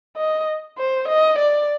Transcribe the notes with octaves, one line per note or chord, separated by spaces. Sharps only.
D#5
C5
D#5
D5